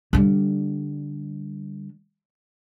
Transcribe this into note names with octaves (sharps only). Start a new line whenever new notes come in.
D3 G3